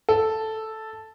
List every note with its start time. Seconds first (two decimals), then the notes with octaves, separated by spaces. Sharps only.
0.09 A4